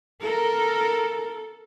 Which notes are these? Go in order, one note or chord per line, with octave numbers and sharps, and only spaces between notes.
A4 A#4